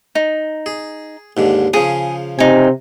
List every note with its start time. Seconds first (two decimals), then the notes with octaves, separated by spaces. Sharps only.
0.15 D#4
0.66 G#4
1.37 D#2 G#2 D3
1.73 C#3 F3 C#4 G#4
2.39 C3 D#4 G#5